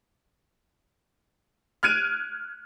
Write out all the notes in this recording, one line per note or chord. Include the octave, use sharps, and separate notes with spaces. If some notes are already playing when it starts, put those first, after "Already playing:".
F6 F#6 G#6 D7 D#7